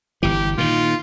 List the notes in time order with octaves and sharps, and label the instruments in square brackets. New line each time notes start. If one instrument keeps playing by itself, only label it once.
[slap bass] G1 E3 [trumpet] G4
[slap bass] A#2 D#3 [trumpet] F4